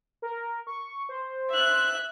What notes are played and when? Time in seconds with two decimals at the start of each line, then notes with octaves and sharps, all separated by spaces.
0.22 A#4
0.67 C#6
1.09 C5
1.50 E5 F#6